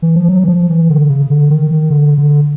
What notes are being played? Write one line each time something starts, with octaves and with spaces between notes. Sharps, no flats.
E3
F3
F#3
E3
F3
E3
D3
C#3
D3
D#3
D#3
D3
D3